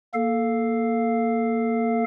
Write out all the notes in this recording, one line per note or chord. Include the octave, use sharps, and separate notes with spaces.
A#3 A4 F5